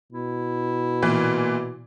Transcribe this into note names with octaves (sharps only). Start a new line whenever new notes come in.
B2 E4
A#2 E3